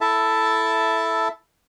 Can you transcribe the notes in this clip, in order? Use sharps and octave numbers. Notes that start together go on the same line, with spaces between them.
E4 A4 E5 A5